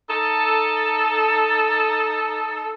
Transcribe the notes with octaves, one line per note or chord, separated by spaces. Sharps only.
D#4 A4